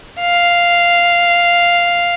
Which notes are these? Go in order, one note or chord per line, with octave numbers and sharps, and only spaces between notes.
F5